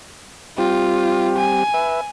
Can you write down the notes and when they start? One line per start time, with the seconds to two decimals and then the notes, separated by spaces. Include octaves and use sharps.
0.58 G3 C4 F4 G4
1.39 G#5
1.74 B4 E5